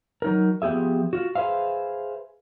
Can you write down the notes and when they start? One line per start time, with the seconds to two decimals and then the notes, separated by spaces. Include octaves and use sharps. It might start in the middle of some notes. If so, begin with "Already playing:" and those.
0.22 F#3 D#4 A#4
0.62 F3 B3 G4 G#4 E5
1.13 F4 F#4
1.35 G#4 B4 C5 E5 F5